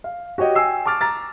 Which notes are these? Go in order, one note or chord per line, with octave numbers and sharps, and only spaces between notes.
F5
F#4 G4 C#5 D#5 G5
G5 G#5 E6 C7
A5 C#6 D6 F6 A6
A#5 A6